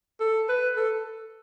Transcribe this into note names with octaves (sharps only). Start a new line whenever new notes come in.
A4
B4
A4